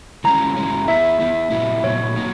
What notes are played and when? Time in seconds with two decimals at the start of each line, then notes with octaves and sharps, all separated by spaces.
0.24 E3 G#3 C#4 A#5
0.57 E3 G#3 C#4
0.88 E3 B3 E4 E5
1.20 E3 B3 E4
1.51 A#2 F#3 B3 E4
1.83 A#2 F#3 B3 E4 C#5
2.15 F#3 A#3 D#4